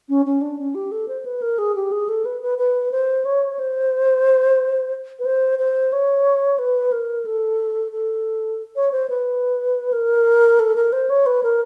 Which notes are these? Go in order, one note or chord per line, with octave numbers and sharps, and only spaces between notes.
C#4
C#4
D4
C#4
G4
A4
C5
B4
A#4
G#4
G4
G#4
A4
B4
B4
B4
C5
C#5
C5
B4
C5
C5
C#5
B4
A#4
A4
A4
C#5
C5
B4
A#4
A4
A#4
C5
C#5
B4
A#4